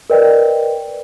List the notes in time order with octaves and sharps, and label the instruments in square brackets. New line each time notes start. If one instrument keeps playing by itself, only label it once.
[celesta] A#4 B4 D5 D#5 G5